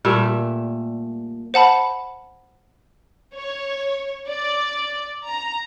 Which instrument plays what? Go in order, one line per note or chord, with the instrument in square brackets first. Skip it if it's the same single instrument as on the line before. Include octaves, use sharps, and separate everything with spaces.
[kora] A#2 G3 A3 E5
[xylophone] C5 F#5 A5 B5
[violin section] C#5
D5
A#5